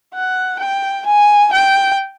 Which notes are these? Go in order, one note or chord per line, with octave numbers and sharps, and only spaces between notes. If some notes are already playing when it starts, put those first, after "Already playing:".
F#5
G5
G#5
G5